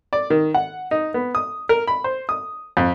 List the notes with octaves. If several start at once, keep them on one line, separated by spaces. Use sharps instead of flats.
D5
D#3
F#5
D#4
B3
D#6
A#4
B5
C5
D#6
F2